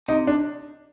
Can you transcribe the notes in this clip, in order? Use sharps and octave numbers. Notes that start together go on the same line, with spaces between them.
C3 D#4
D4